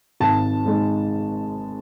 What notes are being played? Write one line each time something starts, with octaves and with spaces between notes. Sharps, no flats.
G#1 A5
G#2 G#3